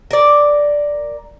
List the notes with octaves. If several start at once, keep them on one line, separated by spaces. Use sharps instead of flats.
A#4 D5